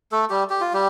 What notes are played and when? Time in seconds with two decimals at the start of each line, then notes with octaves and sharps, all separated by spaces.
0.12 A3 A4
0.30 G3 G4
0.50 G4
0.61 F4
0.74 G3 G4